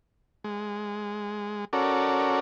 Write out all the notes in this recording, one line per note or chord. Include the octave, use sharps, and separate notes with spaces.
G#3
C#4 F#4 A4 A#4 D5